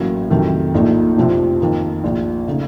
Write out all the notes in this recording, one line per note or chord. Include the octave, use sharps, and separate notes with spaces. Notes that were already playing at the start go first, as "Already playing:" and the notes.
Already playing: A1 A2 F#3 A#3 C#4
F2 C3 D#3 F#3 A3
A#1 A#2 F3 A3 D#4
F1 F2 C3 F3 C4
F2 D#3 A#3 D#4
A#1 A#2 F3
C#3 A3 D#4